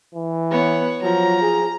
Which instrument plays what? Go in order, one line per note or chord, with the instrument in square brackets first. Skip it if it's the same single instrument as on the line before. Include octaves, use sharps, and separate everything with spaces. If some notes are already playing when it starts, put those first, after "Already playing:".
[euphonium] E3
[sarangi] B3 [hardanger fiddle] C#5 F#5
[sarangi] F3 [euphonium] F#3 [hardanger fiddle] A#5
[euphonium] G#4